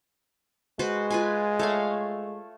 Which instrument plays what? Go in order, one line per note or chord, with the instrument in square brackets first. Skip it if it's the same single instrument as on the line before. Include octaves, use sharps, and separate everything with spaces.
[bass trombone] G#3 [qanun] F#4 B4 C5
[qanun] F4 B4 G#5
A3 C#5 F5